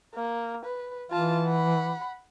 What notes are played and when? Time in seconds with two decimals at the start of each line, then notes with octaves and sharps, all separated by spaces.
0.15 A#3
0.65 B4
1.11 E3 F4 A5
1.46 F#5 B5